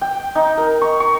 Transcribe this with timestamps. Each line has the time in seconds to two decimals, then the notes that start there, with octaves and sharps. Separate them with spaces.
0.01 G5
0.35 D#4
0.58 A#4
0.82 C#6
1.00 C#6